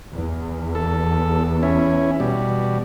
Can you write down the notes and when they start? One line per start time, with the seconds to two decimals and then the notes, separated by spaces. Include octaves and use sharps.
0.13 E2
0.75 A4
1.63 C#4 E4
2.20 B2 G3